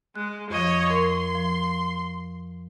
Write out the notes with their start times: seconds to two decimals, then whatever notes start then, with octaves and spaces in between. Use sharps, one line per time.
0.16 G#3 F#6
0.50 F2 F3 C#5 D#5
0.90 A#4 C6
1.35 F3